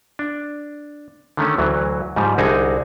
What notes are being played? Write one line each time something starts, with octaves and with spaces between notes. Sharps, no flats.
D4
D3 D#3 A3 C#4
D2 E3 F#3
G#2 C#3 F3 G3
C2 D3 D#4 F#4 G#4 G#5